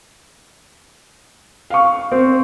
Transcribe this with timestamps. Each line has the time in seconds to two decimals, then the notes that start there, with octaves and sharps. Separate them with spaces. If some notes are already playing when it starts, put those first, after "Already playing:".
1.70 F5 C#6
2.12 C4